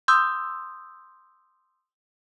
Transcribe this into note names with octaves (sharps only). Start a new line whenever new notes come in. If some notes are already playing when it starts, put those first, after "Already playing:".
C6 D#6 E6 G6